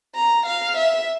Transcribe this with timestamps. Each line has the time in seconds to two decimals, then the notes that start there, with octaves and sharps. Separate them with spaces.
0.15 A#5
0.46 F5
0.77 E5